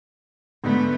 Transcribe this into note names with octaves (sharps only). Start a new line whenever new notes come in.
G#2 D3 A3 B3 D#4